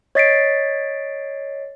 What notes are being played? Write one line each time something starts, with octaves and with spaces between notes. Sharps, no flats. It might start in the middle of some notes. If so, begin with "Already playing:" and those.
C#5 D#5 A6 B6 C7 D7